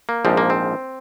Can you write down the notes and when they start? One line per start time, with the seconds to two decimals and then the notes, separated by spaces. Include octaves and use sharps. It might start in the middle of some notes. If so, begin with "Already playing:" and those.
0.09 A#3
0.25 A#1 G#2 F3 C4
0.37 A#3
0.50 C4